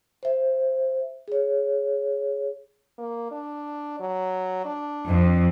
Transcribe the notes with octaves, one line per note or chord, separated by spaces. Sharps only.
C5 E5
G#4 C#5
A#3
D4
F#3
D4
F2